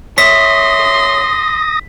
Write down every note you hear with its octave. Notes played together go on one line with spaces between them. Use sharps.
C#5 E5 C6 D#6 A#6 B6